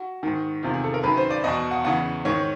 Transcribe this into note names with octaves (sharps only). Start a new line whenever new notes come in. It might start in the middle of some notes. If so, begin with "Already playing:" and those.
Already playing: F#4
G#2 D#3
E2 C3 D#3 F4
G#4
A4
A#4
F#2 D#3 B4
C5
D5
E2 B2 D#5
F#5
E2 C#3 E3 F#5
G#2 D#3 C#5